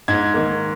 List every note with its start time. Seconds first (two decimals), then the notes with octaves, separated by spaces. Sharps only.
0.08 G#2 G#6
0.34 D#3 A#3